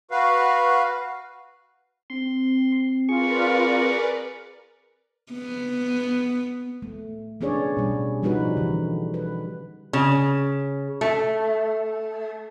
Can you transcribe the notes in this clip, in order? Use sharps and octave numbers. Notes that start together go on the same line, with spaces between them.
F#4 B4 F5
C4 C6
F4 G#4 A#4 B4 D5 C#6
B3
A3
B3 C#4 D4 G#4 C#5 D5
B2 G3
F3 G3 D#4 F#4 B4
D3 E3
B4
C#3
A3